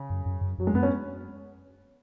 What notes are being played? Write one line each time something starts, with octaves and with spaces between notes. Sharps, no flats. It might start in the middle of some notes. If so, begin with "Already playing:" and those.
Already playing: C#3
F#2
F#2
F#2
F#2 F#3
G#3
F#2 B3
C#4